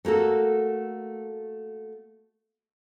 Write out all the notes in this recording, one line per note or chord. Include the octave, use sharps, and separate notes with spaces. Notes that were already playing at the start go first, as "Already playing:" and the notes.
A3 A#3 F#4 A4